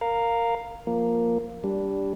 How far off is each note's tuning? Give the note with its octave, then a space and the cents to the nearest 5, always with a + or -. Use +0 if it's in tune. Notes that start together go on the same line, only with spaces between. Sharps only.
A#4 -10 F5 +5
F3 +0 A#3 +0
G3 +0 D4 -15